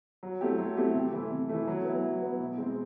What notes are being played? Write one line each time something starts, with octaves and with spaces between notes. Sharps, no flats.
F#3
A3 C4 E4 G4
F#3
A3 C4 E4 G4
C3
E3 A3
C3
E3 A3
F#3
B3 E4
F#3
B3 E4
B2
G#3 C4